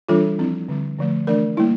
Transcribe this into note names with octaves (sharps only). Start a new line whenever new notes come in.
E3 G3 D4 F4 A4
F3 C4 E4
D3 G3 C4
D3 F3 A3
E3 A3 D4 A#4 D5
G3 A#3 E4